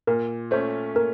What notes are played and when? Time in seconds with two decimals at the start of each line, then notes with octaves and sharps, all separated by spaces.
0.07 A#2 A#4
0.51 A3 C#4 C5
0.95 A#2 A#4